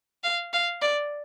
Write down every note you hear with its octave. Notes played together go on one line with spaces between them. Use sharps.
F5
F5
D5